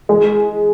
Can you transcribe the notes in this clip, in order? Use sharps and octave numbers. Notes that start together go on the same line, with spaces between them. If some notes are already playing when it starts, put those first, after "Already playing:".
G#3